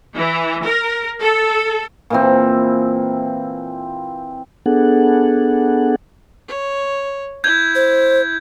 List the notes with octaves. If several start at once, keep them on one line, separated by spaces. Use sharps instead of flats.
E3
A#4
A4
A#2 E3 C4
B3 D4 G#4 A4 F#5
C#5
E4 G6 G#6
C5